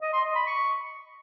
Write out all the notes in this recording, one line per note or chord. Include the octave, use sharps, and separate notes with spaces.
D#5
C6
D#5
B5
C#6